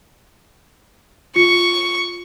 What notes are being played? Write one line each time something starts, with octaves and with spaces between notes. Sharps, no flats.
F4 C#6 C#7